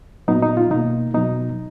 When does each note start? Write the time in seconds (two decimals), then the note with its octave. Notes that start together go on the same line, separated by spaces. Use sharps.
0.28 A#2 F#3 B3 D#4
0.43 D#4
0.57 F4
0.71 B2 A#3 D#4
1.14 B2 F#3 B3 D#4